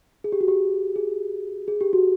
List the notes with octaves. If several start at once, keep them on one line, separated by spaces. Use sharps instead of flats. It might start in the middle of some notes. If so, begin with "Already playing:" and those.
G#4
G4
F#4
G4
G#4
G#4
G4
F#4